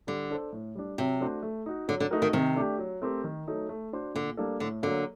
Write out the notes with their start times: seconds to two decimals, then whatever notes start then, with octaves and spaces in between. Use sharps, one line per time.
0.07 D3 G3
0.30 D4 A4 C5
0.52 A2
0.75 G3 D4
0.98 C3 F#3
1.20 A3 D4 F#4 C5
1.43 A3
1.66 D#4 F#4
1.88 D3 F#3
2.00 D3
2.11 A3 D#4 F#4 A#4
2.22 D#3
2.33 C3 D#3
2.56 A3 D4 G4
2.79 F#3
3.02 A3 C4 G4 A#4
3.24 D#3
3.47 F#3 A3 D#4 A4
3.69 A3
3.93 D4 F#4 C5
4.14 A#2 D3
4.37 G3 A#3 D4 A4
4.60 A2 D3
4.83 D3 F#3 A#3